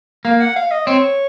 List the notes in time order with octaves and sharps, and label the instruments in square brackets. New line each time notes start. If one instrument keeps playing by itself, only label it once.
[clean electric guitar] A#3 [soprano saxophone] F5
[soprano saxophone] F#5
F5
D#5
[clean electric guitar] C4 [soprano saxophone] C#5